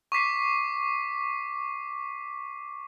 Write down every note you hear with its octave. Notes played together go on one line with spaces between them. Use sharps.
C#6 D6 B6 C7